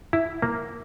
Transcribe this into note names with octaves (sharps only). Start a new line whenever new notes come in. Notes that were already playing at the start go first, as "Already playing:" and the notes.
E4
A#3